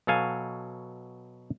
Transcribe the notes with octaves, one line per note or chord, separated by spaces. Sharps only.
B2 F#3 A4 F5 G#5